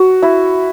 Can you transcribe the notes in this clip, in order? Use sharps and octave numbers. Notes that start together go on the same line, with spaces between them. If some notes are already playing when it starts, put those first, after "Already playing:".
Already playing: F#4
E4